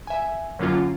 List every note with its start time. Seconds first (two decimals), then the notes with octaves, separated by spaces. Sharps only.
0.07 E5 G#5
0.59 F#2 D3 F#3 A#3 C#4 F4